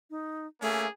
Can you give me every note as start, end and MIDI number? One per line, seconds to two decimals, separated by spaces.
0.10 0.47 63
0.62 0.86 57
0.62 0.87 58
0.62 0.87 61
0.62 0.87 68